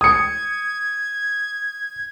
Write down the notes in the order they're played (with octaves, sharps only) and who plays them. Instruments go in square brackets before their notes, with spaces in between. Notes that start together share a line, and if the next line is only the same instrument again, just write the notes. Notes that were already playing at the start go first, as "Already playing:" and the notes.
[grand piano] D#6 C#7 [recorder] G#6